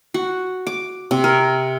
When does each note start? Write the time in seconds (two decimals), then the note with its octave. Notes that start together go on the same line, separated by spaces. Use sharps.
0.14 F#4
0.67 D6
1.11 C3
1.24 A#4